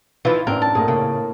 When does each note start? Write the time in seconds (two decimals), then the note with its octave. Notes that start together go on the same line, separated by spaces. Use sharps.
0.25 E3 F3 D#4 F4
0.47 A1 C4 D4 A#4
0.62 A5
0.75 A#1 A3 G#4 A#4
0.88 A2 C#3 A#3